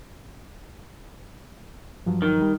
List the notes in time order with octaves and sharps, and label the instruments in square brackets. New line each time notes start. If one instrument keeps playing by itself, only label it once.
[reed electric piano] G2 F3 F#3
[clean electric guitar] D#3
[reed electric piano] G3